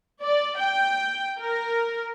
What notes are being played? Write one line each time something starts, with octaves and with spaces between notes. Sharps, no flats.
D5
G5
A#4